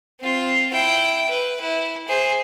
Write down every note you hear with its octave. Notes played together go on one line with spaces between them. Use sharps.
C4 F4
E4 G5
B4
E4
G#4 C5